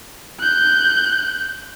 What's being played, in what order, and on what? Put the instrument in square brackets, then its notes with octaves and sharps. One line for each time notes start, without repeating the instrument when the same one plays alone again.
[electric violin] F#6 G6